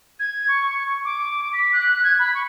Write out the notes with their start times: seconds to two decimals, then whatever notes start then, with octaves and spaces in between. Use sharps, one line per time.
0.20 G#6
0.48 C#6
1.05 D6
1.53 B6
1.73 F#6
2.04 G#6
2.19 B5
2.34 C#6